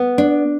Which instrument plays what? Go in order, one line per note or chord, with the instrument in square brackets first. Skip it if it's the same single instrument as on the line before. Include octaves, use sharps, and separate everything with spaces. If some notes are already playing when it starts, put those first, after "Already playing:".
Already playing: [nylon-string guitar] B3
D4